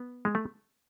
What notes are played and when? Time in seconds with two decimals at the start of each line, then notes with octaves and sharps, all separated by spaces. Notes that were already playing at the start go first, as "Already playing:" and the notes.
Already playing: B3
0.25 G#3
0.35 A3